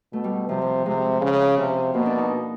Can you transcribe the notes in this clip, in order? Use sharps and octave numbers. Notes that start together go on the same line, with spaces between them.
B2 A3
G3
C3 F3
F3
C3 G#3
C#3
C3
B2 A#3
D4
D#4